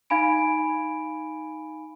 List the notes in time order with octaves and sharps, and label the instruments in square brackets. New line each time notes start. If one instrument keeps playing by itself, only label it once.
[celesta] D#4 F5 G#5 B5 D7